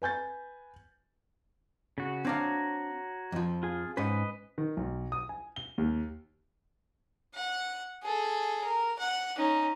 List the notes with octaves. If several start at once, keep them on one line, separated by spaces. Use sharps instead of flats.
B4 G#5 G6 A6
C#3 F#4
C4 D4 F#4 C#5 F5 A#5
F2 F3
F4 G#4
G#2 C#4 B4 C5 D#5
D#3
B1
D#6
G#5
G7
D#2
F#5
G#4 A4
A#4
F#5
C#4 D#4